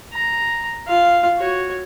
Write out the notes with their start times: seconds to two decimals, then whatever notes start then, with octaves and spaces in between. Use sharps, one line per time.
0.14 A#5
0.87 F4 F5
1.38 F#4 C#5